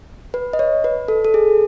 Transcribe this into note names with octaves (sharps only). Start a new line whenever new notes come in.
B4
D#5
C#5
B4
A4
A4
G#4